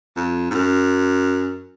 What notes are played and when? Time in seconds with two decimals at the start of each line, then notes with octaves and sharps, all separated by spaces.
0.16 F2
0.51 G#2
0.55 F#2